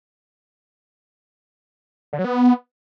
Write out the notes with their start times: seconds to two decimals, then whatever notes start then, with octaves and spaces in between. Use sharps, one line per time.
2.13 D3
2.19 F#3
2.24 B3